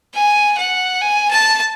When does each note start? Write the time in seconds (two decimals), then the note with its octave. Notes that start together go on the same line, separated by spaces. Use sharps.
0.14 G#5
0.57 F#5
1.01 G#5
1.30 A5